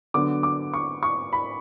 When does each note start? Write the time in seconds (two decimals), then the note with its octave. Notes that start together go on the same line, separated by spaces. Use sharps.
0.14 D3 F#3 B3 D6
0.43 D6
0.74 C#6
1.03 C#6
1.33 B5